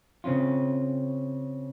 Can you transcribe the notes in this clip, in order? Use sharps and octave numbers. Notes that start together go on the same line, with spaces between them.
C#3 C4 C#4 F4